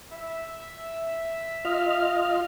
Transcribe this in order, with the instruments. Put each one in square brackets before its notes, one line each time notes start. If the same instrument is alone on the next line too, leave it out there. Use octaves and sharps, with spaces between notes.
[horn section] E5
[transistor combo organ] F4 [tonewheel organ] D#5 F6